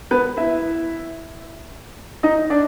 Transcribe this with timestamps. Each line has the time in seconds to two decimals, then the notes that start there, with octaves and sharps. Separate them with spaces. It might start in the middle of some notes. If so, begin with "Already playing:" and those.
0.11 B3 B4
0.37 E4 E5
2.23 D#4 D#5
2.50 D4 D5